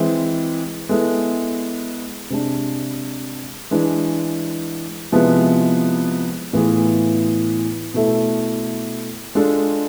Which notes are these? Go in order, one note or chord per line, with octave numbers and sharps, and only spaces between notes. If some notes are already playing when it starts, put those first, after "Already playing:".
Already playing: E3 G#3 C4 E4
G#3 B3 E4 A4
C3 G#3 D4
E3 G#3 D4
C3 F3 G#3 B3 E4
A2 E3 B3 F4 G#4
B2 A3 E4 A4
G#3 D4 F4 A4